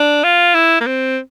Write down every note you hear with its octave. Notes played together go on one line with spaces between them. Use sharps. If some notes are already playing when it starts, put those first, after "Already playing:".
Already playing: D4
F4
E4
A#3
C4